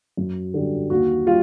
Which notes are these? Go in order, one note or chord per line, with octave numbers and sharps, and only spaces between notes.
F#2
D3 G3
D#2 F#4
G3 F4